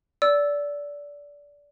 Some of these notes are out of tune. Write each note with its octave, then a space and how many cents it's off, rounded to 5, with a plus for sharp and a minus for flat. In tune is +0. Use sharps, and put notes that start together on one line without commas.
D5 -20 E6 +0